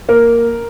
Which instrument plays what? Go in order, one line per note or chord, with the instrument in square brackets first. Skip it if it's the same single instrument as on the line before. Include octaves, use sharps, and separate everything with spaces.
[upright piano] A#3 A#4